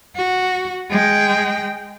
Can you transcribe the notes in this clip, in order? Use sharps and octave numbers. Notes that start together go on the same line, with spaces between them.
F#4
G#3 G5